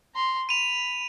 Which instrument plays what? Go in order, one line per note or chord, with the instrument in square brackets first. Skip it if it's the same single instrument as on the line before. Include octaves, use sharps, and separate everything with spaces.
[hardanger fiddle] A#5 C6
[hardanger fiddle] B5 [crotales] D#7 F7